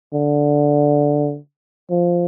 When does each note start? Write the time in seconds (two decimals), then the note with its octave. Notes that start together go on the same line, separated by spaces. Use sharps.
0.13 D3
1.91 F3